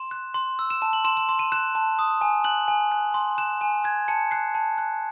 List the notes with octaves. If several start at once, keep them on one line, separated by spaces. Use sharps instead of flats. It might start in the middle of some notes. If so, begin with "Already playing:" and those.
Already playing: C6 E7
F#6
C6
E6
E7
A5 E7
F#7
C6 E7
E7
C6
D#7
F#6 E7
A5
D#6
G#5
F#6 F#7
G#5
F#6
C6
F#6 E7
G#5
F#6 G#6
A5 C#7
F#6 C7
A5
F#6